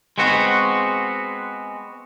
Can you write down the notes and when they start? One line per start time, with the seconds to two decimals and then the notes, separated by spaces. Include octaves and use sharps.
0.18 G#3 B3 C4 F#4